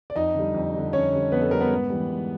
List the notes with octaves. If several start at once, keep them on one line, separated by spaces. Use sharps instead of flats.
D5
F2 D#4 D#5
D3 G3
F2
D3 G3
F2 C#4 C#5
D3 G3
F2 B3 B4
A4
D3 G3 A#4
B3 B4
G#2
E3 G3
G#2